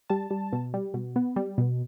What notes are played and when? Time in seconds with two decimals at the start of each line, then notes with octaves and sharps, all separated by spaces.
0.10 G3 A5
0.31 G3
0.53 B2
0.74 G3
0.94 B2
1.16 B3
1.36 G3
1.58 B2